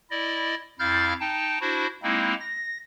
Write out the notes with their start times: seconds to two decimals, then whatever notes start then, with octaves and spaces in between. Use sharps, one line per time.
0.11 E4 D5 D#5
0.79 F2 E4 F5 F6 G6 A6
1.20 D#4 G5 A5
1.61 D4 E4 F#4 C5
2.03 G#3 A#3 C4 D#4 E4
2.40 A#6